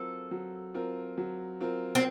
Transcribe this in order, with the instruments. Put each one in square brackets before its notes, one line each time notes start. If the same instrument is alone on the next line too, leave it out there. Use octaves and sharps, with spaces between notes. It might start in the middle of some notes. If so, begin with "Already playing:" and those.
Already playing: [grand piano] F#3 C4 F4 A#4 [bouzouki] A4
[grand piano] F#3
C4 F4 A#4
F#3
C4 F4 A#4
[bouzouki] C4